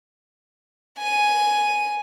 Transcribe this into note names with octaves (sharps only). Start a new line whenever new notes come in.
G#5 D#7